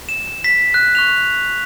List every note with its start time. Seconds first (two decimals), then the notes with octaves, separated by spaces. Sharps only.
0.09 E7
0.44 B6
0.74 F#6
0.95 C#6 F#6 F7